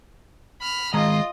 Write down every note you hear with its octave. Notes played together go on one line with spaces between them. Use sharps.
B5 F6
D#3 G#3 F4 D#5 A#5